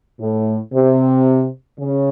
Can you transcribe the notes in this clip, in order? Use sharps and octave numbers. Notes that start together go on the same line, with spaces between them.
A2
C3
C#3